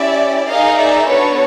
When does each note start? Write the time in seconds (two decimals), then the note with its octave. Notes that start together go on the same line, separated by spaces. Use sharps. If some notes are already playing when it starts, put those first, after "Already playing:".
Already playing: C#4 E4 G4 D5 E5
0.49 A#3 D#4 G#4 D#5 F5
0.79 D5 E5
1.08 B3 D4 F#4 A4 B4 C#5